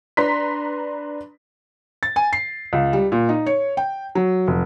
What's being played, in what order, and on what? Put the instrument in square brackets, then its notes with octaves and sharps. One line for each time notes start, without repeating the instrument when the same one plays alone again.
[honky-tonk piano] D4 B4 A#5 C6 B6
[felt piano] A6
G#5
C7
C#2
G3
A#2
D#4
C#5
G5
F#3
F1